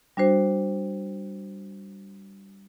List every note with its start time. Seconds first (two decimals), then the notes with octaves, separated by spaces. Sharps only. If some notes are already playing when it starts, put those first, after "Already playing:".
0.17 G3 D4 F#4 C5